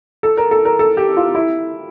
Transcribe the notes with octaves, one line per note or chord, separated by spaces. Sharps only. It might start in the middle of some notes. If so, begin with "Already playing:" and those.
A4
A#4
A4
A#4
A4
G4
F4
E4